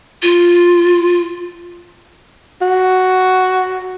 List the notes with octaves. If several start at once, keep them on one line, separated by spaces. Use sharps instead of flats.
F4
F#4